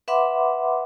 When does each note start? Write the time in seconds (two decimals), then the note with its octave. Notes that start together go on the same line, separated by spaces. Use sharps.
0.08 B4 E5 F#5 B5 C6 D6